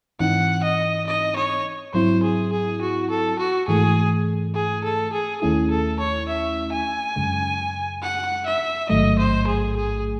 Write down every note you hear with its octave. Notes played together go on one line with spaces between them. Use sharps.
G#2 E3 C4 D#4 F#5
D#5
D#5
C#5
G#2 F#3 C4 E4 C5
G#4
G#4
F#4
A4
F#4
G#2 E3 A3 G#4
G#4
A4
G#4
D#2 D#3 A3 C#4 E4 G#4
A4
C#5
E5
G#5
F#2 C#3 G#3
F#5
E5
A1 G#2 D#3 F#3 A3 D#5
C5
G#4
G#4